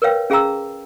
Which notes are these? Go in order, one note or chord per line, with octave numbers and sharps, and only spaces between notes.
A#4 B4 C#5 F5 G5
C#4 G#4 F5 G5 A#5 E6